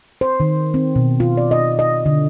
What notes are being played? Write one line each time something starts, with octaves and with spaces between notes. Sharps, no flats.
C5
D#3
C4
B2
F4
D5
D#5
D#5
D3